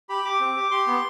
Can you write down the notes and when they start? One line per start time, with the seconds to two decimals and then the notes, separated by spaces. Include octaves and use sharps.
0.09 G4 B5
0.24 G4 D6
0.40 C4
0.57 G4
0.71 G4 C6
0.87 B3